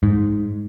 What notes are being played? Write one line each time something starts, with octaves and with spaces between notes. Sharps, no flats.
G#2